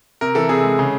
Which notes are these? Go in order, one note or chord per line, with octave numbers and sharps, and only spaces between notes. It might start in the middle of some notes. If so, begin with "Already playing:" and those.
C3 A#4
E3 A4
C3 G#4
G#3
C#3